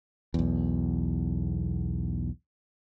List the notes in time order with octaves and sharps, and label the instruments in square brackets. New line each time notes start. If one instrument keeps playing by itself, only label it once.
[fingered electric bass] B1 E2